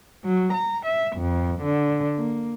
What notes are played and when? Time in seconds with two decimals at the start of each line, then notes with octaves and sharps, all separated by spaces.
0.25 F#3
0.55 A#5
0.86 E5
1.18 F2
1.63 D3
2.18 A#3